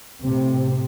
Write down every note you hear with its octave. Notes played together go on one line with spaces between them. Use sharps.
A2 C3